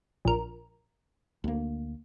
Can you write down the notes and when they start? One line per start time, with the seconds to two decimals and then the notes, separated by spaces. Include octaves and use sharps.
0.25 A#1 A#4
1.44 D2 A#3